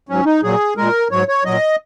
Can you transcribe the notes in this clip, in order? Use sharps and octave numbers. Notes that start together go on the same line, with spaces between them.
G#2 F#3 C#4
D#4
A#2 F#3 G#4
A#2 G#3 A#4
G#2 F#3 C#5
C#5
A#2 F#3 D#5